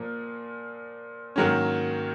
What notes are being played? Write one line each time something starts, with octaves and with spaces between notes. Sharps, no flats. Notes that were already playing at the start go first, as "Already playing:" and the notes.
Already playing: A#2 F3 A#3
G#2 D#3 F#3 A#3 C#4